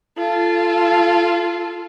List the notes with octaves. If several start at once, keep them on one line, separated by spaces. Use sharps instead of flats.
F4 A4